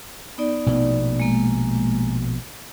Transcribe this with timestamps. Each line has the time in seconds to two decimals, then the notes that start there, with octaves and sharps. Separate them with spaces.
0.38 B3 D#4 D5
0.66 A#1 B2 A3
1.20 G#3 A#3